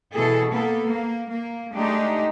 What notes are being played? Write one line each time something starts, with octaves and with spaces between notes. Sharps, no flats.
B2 E3 G#4 A4
A#3 B3 A4
A#3
A#3
G#3 A3 D4 D#4 G4